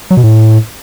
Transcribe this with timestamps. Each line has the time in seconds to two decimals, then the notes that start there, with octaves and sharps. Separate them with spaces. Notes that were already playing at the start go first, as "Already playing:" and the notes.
0.11 F#3
0.17 B2
0.24 A2